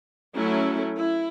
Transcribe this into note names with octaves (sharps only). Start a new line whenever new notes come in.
F#3 A3 C#4 E4
E4